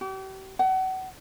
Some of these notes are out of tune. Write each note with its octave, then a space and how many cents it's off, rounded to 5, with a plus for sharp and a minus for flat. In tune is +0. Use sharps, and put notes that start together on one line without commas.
G4 -40
F#5 +30